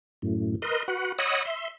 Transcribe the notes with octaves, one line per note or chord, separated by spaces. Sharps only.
F#2 A2
A#4 B4 D#5 C6
F#4 B4 F#5
C#5 D#5 F#5 B5 D#6 E6
E5 C6